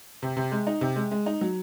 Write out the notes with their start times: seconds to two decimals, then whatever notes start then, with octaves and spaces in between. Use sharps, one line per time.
0.22 C3
0.37 C3
0.52 G#3
0.67 D#4
0.81 C3
0.96 G#3
1.11 G#3
1.26 D#4
1.41 F#3